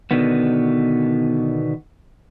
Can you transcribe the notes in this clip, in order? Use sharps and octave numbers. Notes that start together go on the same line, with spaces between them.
B2 D3 D#3 B3